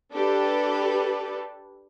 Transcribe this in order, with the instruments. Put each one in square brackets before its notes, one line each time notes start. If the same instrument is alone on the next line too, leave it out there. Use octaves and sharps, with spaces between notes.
[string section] D4 G4 A4 B4